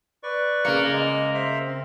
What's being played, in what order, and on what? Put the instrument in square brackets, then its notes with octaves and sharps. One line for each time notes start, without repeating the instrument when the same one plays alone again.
[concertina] B4 D5 C#6
[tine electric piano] C#3 C#7 [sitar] A#3
[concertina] G#3 D#5
C5 E5
C4